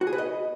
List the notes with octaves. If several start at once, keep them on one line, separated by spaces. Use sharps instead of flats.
F#4
G#4
B4
D#5